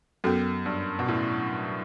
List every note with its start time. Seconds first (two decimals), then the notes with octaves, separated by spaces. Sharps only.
0.24 F#2 B3 F#4 A4
0.66 G2
0.99 B2
1.09 A2